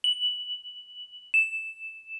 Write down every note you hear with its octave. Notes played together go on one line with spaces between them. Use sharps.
F#7
E7